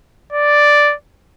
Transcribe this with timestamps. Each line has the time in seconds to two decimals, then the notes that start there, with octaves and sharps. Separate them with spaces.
0.33 D5